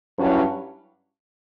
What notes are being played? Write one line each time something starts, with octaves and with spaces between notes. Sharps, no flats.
G2 F#3 C#4 E4